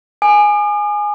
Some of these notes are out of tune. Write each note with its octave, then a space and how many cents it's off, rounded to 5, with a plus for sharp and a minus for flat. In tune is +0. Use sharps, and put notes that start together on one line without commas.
G#5 +0 D#6 -45